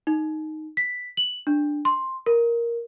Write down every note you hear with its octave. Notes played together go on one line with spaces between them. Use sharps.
D#4
B6
F#7
D4
C6
A#4